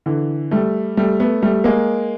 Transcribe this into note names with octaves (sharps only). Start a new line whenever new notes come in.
D3 E3
G3 A3
G3 A3
A3 B3
G3 A3
G#3 A#3